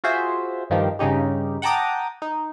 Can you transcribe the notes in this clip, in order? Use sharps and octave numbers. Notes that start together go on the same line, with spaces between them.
F4 F#4 G#4 C5 E5
G2 D#3 F3 D#4 G4
G2 C#3 C#4 D#4 G4
F#5 G5 A5 A#5 D6 D#6
D#4